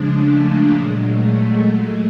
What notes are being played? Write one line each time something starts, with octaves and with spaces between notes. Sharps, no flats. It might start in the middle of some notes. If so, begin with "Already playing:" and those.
Already playing: C#3 F3 G#3 D4
A3
A#3
A#2 F#3 G#3
A3